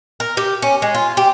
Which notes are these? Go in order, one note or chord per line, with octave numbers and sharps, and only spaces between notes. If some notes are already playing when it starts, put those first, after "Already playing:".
A#4
G4
C#4
G#3
F4
G4